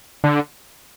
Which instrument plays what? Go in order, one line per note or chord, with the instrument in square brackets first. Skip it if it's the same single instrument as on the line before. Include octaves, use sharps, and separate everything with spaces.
[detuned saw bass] D3